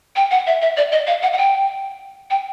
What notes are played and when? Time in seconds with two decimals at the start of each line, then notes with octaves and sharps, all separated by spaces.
0.16 G5
0.31 F#5
0.47 E5
0.62 E5
0.77 D5
0.92 D#5
1.07 F5
1.23 F#5
1.33 F#5
1.38 G5
2.31 G5